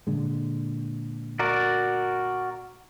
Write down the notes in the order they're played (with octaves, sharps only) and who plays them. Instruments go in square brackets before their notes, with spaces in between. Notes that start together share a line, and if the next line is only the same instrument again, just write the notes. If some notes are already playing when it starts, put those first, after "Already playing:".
[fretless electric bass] A#2 D3 G#3
[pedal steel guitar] F#4 A#4 D5